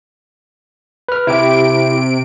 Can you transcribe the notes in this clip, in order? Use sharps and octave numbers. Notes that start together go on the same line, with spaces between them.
B4 F6
C3 E4 G4 D7